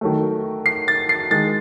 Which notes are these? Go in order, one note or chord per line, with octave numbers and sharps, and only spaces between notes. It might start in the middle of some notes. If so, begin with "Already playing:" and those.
D#3 F#3 A3
C7
A6
C7
D#3 G#3 A6